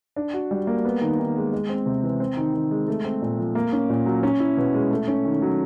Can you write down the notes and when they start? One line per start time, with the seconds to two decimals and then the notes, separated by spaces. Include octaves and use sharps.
0.16 D4
0.33 F#4
0.51 G3
0.67 A#3
0.85 B3
1.01 D#3
1.19 D#3
1.36 G#3
1.52 G#3
1.69 C4
1.86 C3
2.03 E3
2.20 C4
2.37 D#3
2.54 D#3
2.71 G#3
2.88 A3
3.05 C4
3.22 A#2
3.39 F3
3.55 A#3
3.73 C#4
3.89 A#2
4.06 F#3
4.23 C#4
4.40 E4
4.57 B2
4.74 G#3
4.91 A3
5.08 C#4
5.25 D#3
5.42 F#3